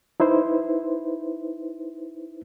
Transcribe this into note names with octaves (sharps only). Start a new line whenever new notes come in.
D#4 E4 B4 C5